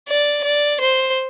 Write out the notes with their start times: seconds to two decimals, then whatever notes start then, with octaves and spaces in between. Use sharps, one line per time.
0.09 D5
0.44 D5
0.80 C5